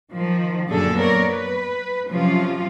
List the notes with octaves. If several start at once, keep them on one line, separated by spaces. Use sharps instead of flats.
D#3 F3
F#2 A#2 D3 F#3 G#4 A4
B3 A#4 C#5 D5
B4
C3 F3 F#3 C#4 F4